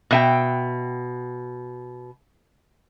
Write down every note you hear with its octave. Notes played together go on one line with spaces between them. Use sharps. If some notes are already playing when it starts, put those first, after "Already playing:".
B2 E5 G5